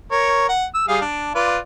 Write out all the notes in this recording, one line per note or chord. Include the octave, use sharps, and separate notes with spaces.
A#4 C#5
F#5
E6
G3 G#4 F5
D4
F4 B4 D5